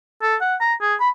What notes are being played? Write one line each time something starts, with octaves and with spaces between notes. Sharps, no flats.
A4
F#5
A#5
G#4
B5